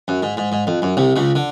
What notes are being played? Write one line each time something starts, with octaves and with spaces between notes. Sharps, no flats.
F#2
G#2
G#2
G#2
F2
F#2
C2 C3
C#2 C#3
D3